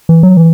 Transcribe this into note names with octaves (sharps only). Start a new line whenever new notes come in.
E3
F#3
E3